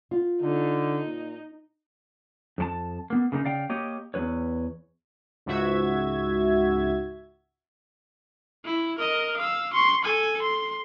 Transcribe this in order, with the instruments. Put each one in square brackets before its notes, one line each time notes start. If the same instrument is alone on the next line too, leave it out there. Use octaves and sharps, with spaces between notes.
[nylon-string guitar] F4
[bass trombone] D3 [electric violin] D#4
[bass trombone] A#2
[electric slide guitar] F2 D4 A5
A#3 B3
C#3 A#3 C4 D#4
C#3 D5 F5 G5
A#3 G4 C#5 D#5
E2 A#3 B4 C#5
[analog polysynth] C#2 G#2 F#4 E5 G#6
[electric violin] E4
A#4 D#5
F5 E6
C6 C#6
A4 G#5
C6